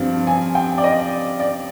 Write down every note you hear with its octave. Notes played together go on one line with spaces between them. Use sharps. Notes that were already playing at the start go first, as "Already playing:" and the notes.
Already playing: G2 F3 C4
G#5
G5
D5
D#5
D5